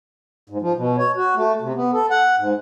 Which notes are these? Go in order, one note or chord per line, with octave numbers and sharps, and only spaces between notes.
G#2
F3
B2
C#5
F#4
A3
C3
B3
A4
F#5
G#2